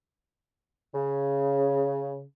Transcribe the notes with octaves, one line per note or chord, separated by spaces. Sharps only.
C#3